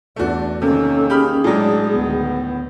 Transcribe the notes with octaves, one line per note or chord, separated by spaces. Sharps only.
E2 A3 D4 F#4
C3 D#3 A#3 C#4 A4
G4 G#4 B5 F6
A2 F#3 G#3 D4
D2 D#3 B3